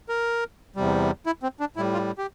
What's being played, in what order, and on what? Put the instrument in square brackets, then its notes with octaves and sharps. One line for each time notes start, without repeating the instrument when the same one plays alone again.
[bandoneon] A#4
E2 C3 G3
E4
C4
D4
A2 G3 E4
F4
G4